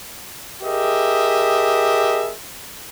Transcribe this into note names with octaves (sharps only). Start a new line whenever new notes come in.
G4 G#4 A#4 D#5 E5